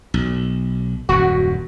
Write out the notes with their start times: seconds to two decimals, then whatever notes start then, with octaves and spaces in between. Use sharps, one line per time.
0.14 B1
1.09 D#1 F#2 F#4